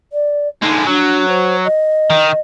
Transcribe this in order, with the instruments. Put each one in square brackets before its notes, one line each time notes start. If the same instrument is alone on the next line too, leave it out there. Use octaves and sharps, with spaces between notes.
[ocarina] D5
[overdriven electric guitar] D3 G#3 [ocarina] D#4
[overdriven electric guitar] F#3 [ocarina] D4
[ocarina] C5
D#5
[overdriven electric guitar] D#3